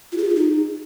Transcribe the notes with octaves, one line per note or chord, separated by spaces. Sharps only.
F4
G#4
F4
G#4
D#4